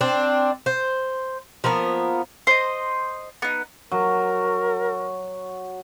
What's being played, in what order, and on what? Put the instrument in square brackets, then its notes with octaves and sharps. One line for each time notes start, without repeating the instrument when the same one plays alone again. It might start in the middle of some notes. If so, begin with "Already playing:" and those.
[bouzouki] C4 D4
C5
F3 A#3 B3 A#4
[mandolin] C5 D#5
B3 D#4
[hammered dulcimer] F#3 [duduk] A#4